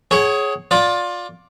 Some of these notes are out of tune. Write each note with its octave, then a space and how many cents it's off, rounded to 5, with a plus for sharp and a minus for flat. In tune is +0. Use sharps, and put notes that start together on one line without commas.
G#4 +15 C#5 -10 F#5 +30
F4 +20 D5 +0